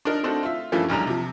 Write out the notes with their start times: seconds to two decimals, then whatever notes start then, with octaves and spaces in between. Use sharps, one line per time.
0.05 D4 D#4 A#4
0.23 A3 C4 D4 D#4 F#4 A4
0.43 F4 E5
0.72 G2 E3 F3 A3 A#3 C#4
0.89 F1 B1 E2 G3 D4 A#5
1.07 C3 F3